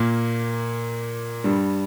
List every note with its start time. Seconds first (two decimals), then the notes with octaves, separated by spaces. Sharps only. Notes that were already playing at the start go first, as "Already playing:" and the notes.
Already playing: A#2 A#3
1.44 G2 G3